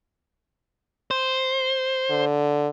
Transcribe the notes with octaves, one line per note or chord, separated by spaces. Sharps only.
C5
D3